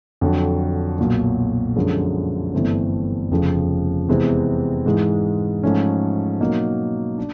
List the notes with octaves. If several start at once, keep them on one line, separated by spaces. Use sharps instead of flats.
F2 D3 F#3
B1 A#2 F#3
F#2 D3 F3 G#3
G1 G2 E3 A3 C4
F1 F2 C#3 F3
E2 C3 E3 G#3 C4
G#2 E3 G#3
G#2 F3 A3 C#4
B2 F#3 A#3 D#4
D4